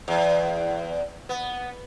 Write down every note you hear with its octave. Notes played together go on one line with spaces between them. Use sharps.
E2
B3